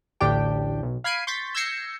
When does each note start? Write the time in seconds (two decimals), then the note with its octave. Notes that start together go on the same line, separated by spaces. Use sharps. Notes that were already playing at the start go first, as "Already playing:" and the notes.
0.21 A1 D2 A2 D4 G4 G5
0.83 B1
1.04 F5 B5 G#6 C7 D7 D#7
1.27 C6 C#6 G6 A6 B6
1.55 E6 G6 G#6 A#6 C7 C#7